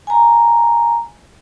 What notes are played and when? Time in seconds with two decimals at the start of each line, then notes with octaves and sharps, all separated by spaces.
0.07 G#5 A#5